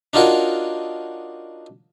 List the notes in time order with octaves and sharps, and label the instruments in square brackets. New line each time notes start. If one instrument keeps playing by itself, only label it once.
[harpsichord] D4 D#4 F4 F#4 A#4 C#5